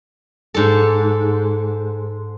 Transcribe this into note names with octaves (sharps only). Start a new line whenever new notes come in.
G#2 A4